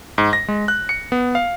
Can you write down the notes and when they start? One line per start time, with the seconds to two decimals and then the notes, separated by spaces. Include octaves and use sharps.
0.18 G#2
0.33 A#6
0.48 G#3
0.68 F#6
0.89 C#7
1.12 B3
1.35 F5